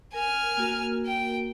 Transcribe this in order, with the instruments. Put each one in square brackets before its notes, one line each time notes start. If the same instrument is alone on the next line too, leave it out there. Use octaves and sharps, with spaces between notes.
[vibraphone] A#4 [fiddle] G#5 F6
[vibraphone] A#3 F#4 A#4
[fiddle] G5